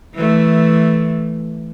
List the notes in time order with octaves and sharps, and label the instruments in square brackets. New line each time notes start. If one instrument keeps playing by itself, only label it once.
[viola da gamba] E3 A3